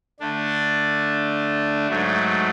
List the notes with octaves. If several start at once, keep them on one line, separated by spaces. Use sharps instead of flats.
D3 A3 D4
G#2 F#3 A3